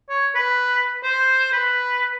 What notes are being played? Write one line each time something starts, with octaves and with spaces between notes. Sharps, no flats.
C#5
B4
C5
B4